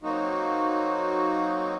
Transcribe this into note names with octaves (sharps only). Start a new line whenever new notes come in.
F#3 A#3 C4 D#4 F#4